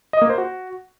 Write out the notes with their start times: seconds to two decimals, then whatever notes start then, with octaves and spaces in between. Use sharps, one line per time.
0.13 D#5
0.22 A#3
0.30 C5
0.38 F#4